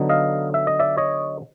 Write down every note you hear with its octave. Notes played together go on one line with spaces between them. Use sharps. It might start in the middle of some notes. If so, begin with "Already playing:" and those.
Already playing: D3 F#3 B3 D#4
D#5 F5
E5
D#5
D5 E5
C#5 D#5